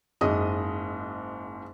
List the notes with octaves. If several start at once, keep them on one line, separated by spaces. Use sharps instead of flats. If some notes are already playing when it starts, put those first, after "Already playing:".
F#1 G#2 D#5 D#6